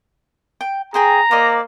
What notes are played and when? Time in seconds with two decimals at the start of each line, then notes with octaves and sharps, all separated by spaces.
0.61 G5
0.94 G#4 C5 G5 G#5 A#5
1.31 A#3 C5 D5 D#5